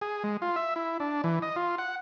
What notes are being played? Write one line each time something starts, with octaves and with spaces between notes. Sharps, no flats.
G#4
G#3
F4
E5
E4
D4
E3
D#5
F4
F#5